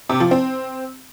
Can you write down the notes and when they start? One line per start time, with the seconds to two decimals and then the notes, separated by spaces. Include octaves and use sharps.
0.10 C3
0.20 F3
0.31 C4